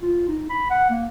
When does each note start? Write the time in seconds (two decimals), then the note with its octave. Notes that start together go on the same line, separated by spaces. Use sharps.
0.02 F4
0.28 D#4
0.49 B5
0.70 F#5
0.90 A#3